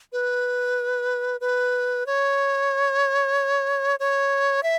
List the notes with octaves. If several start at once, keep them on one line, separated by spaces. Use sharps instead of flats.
B4
B4
C#5
C#5
E5